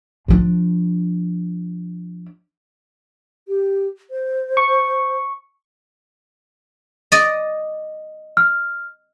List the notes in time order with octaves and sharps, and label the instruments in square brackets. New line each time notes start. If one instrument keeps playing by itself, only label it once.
[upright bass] F3 D4
[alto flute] G4
C5
[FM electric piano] C#6
[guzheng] D5 D#5
[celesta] F6